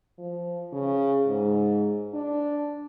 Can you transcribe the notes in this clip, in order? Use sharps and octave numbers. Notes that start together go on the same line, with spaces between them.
F3
C#3
G#2
D4